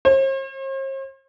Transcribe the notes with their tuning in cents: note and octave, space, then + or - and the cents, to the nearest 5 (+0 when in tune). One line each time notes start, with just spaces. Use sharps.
C5 +45